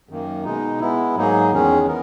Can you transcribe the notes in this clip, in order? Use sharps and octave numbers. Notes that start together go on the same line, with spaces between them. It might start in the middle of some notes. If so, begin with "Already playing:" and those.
F#2 D#3 A#3
B2 G#3 D#4
G#3 B3 E4
G#2 F#3 A#3 D#4 G#4
E2 D#3 G#3 C#4 G#4
E3 B3 A#4